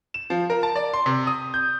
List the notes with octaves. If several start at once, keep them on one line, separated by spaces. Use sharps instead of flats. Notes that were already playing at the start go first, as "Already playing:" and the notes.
E7
F3
A#4
A5
D5
C6
C3
D#6
G6